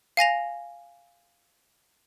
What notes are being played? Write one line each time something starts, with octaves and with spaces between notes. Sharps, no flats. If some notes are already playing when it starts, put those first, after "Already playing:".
F5 G#5 A#6 F7